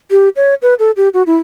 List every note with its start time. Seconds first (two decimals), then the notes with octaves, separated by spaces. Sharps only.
0.11 G4
0.36 C#5
0.62 B4
0.79 A4
0.97 G4
1.14 F#4
1.27 E4